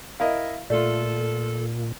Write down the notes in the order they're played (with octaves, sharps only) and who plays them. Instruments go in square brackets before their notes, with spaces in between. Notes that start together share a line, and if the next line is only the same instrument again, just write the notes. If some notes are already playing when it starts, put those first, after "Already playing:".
[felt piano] E4 A#4 D#5 [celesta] F5
[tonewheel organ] A#2 [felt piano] A3 F4 [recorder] A4 [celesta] D5